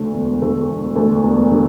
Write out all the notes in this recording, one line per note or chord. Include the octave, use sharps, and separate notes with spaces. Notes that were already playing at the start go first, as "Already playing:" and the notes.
Already playing: D2 D3 A3
E1
D2 D3 A3
E1
D2 D3 A3
E1
D3 A3